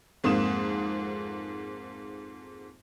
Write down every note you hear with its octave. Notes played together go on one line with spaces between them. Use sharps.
F2 G#2 A#3 D#6 E7